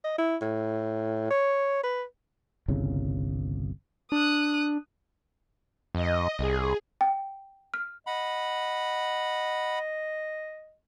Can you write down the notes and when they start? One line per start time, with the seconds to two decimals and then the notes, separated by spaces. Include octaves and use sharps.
0.04 D#5
0.18 E4
0.42 A2
1.31 C#5
1.84 B4
2.68 G1 C2 C#3
4.12 D4 D#6 F#6
5.95 F2 D#5
6.39 C2 G#4
7.01 G5
7.74 F6
8.07 D#5 F#5 B5